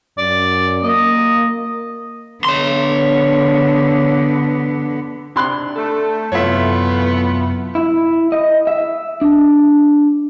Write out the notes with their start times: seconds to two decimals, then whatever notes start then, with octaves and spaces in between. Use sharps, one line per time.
0.18 F#2 D5
0.83 A#3 D#5
2.45 D3 B3 C#5 C6
5.36 C3 D4 C6 F#6
5.75 A3 A4
6.32 F#2 C3 E3 A3 B3 F4 C#5 E5
7.75 E4
8.32 D#5
8.67 E5
9.21 D4